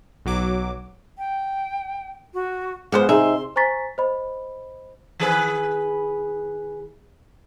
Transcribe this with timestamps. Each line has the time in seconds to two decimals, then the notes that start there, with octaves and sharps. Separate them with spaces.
0.25 B1 F#3 D6
1.18 G5
2.34 F#4
2.92 F3 G#3 B3 C5 F#5
3.09 C3 D#4 G#4 E5 C6
3.56 C5 G#5 A#5 C#6 A6 B6
3.98 C5 D#5 B5
5.20 D#3 G#4 B4